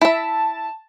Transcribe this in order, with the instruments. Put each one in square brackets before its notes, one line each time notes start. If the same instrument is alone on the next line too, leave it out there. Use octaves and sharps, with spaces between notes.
[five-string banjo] E4 E5 [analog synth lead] A5